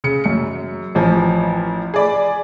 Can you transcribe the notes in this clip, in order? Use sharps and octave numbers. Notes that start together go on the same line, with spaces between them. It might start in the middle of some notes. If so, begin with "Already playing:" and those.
C#3 C#7
F#2 C#7
A1 F3 G#5
G#4 D5 B5